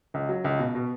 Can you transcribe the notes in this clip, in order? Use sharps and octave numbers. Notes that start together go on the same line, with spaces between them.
C#2
F#3
C#2
B2
B2